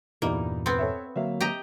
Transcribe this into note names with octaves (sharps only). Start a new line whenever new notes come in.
E2 G2 A#2 G3 A#3 D#4 E4
B3 C4
A4 C#5 E5
D3 F#3 A#3 E5 F5
G4 D#5 A#5